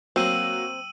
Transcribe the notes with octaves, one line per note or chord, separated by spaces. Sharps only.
F#3 A#3 C4 E6 D#7 F#7